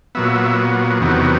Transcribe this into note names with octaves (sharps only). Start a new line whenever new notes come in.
A#2 F#3 B3 E5
E2 C3 D#3 F#3 B3